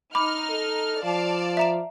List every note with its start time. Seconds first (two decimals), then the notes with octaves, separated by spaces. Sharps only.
0.15 D#4 B5 D6 F6
0.50 A4
1.04 F3 D5 F5 A5
1.57 E5 A#5 E7